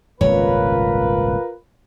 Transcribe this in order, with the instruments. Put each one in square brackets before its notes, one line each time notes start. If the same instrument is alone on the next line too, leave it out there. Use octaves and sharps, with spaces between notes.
[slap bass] D#1 G#1 C#2 [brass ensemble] F4 A#4 B4 [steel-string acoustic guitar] C#5